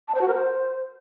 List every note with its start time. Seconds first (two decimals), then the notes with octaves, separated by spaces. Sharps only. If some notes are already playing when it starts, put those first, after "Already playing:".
0.08 A5
0.14 C5
0.21 F#4
0.28 A#4
0.34 C5